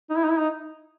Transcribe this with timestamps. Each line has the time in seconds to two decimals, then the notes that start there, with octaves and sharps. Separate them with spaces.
0.10 D#4
0.16 E4
0.24 D#4
0.31 E4
0.38 D#4